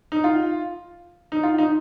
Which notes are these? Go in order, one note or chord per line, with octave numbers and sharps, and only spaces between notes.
D#4
F4
D#4
F4
D#4